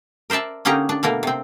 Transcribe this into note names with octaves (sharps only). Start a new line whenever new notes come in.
A#4 C5 D5 E5 A5
D3 A#3 C#4 D#4 G4 A#5
D4
B2 A3 A#3 A#4
C3 C4